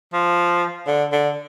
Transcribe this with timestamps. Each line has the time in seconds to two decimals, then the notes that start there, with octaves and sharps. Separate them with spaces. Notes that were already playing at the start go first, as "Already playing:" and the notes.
0.13 F3
0.87 D3
1.12 D3